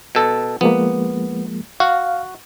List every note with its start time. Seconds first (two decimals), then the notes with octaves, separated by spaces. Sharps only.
0.15 B2 A4
0.61 F3 G#3 A#3 B3
1.80 F#4 F5